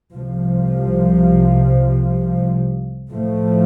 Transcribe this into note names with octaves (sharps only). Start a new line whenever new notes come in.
C2 C3 F3
A2 F3 A3